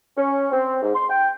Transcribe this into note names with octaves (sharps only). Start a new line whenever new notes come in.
C#4
C4
G#2
C6
G5